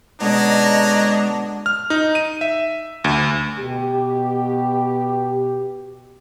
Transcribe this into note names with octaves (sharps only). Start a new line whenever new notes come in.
B2 D3 G#3 D4 C#5 D#5 A#5
F6
D#4
D#7
E5
D2
B2 G4